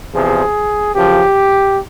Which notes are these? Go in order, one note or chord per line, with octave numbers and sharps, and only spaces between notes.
E2 C3 F3 G#4
F#2 C#3 F3 G4